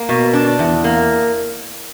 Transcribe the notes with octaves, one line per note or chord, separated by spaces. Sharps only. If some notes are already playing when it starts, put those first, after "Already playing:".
Already playing: A#3
B2
D4
E2
A#3